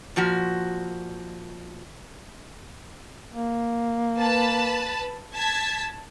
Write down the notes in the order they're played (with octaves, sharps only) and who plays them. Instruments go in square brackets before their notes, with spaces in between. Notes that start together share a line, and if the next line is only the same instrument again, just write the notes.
[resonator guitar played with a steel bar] A#2 F3 F#4
[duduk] A#3
[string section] B4 A5 B5
A5 G#6 B6